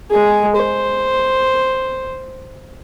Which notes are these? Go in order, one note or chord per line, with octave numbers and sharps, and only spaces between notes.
G#3 G#4
C5